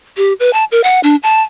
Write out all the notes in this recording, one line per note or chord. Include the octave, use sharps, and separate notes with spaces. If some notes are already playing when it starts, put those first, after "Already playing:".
G4
B4
A5
A#4
F#5
D4
A5